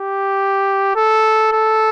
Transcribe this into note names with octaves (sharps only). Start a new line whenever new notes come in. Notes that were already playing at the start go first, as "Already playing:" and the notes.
Already playing: G4
A4
A4